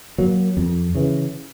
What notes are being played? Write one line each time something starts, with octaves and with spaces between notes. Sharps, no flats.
F#3 A#3
F2
C#3 E3